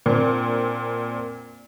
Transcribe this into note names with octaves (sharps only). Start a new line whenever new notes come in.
A#2 C4 D4